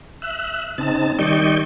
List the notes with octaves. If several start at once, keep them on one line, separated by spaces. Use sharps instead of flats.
E5 F#6
C#3 C4 D#4 A5
D#3 G3 D5 D#5 C#6 G6